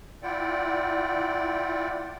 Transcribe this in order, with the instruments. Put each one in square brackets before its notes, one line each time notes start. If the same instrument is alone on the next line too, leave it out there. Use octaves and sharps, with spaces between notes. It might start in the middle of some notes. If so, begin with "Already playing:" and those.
[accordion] E4 F4 D5 F#5 G5